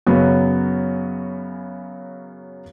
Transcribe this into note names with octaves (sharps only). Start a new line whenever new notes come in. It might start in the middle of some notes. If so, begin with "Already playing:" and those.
F#2 C#3 F#3 B3 F#4